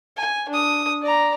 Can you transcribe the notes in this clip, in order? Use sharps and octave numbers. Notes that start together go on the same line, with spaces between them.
G#5
D4 D#6
D5 A#5